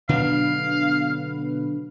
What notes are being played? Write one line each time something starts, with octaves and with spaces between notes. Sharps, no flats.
B2 D3 F#3 D4 B4 F5